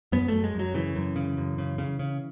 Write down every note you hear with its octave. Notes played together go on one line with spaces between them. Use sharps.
F#2 B3
F#2 A3
G#3
F#2
F#3
C#3 E3
F#2
C#3
F#2
C#3
C#3
C#3